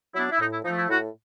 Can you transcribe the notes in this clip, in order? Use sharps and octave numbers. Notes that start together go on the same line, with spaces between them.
F#3 B3 D4 E4
E4
A2 D#4
E4
F3 A3 D#4
E4
A2 E4 F#4